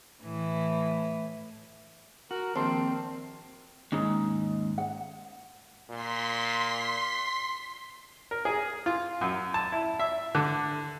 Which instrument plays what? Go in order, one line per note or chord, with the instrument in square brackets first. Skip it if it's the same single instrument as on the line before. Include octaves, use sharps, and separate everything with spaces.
[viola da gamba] A2 E3
[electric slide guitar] F#4 [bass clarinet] A#4
[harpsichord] A#1 [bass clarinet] D#3 [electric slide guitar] C4 [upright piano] A5 C6
[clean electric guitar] D#2 G#2 [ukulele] C#4 D#4
[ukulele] F#5
[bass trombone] A#2 [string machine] C6 B6
[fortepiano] A#4
G#4
F4
F#2
A5
E4
E5
D3